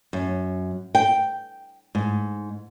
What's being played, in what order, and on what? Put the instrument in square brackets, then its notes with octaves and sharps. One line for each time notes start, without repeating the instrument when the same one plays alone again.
[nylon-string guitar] F#2
G5
G#2